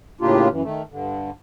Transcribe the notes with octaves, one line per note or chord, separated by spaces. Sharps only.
A2 C#3 A#3 D4 F4 G4
F#2 E3
D#3 A3
G2 D3